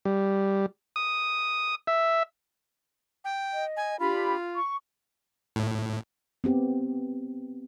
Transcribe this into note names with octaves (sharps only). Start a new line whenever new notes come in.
G3
D#6
E5
G5
D#5
G#5
D4 F4 G4 B5
C#6
A2
B3 C4 G4